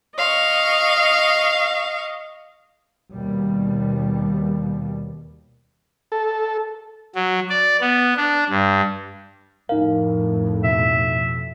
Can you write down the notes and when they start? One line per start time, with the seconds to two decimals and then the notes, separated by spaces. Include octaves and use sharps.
0.17 D#5 F5 C#6
3.12 D#2 B2 G3
6.12 A4
7.15 F#3
7.49 D5
7.81 B3
8.17 D4
8.49 G2
9.69 F2 A2 D#4 A#4 F5
10.64 B2 E5